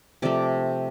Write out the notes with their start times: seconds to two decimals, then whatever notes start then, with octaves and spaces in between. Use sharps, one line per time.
0.22 C3 F3 A3 D5